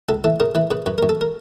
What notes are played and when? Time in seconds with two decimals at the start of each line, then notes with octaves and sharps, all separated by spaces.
0.09 C#2 A4
0.24 E3 A4
0.40 C#3 A#4
0.55 E3 B4
0.71 C#3 B4
0.86 F#2 B4
0.98 F#2 A#4
1.09 A4
1.21 A#4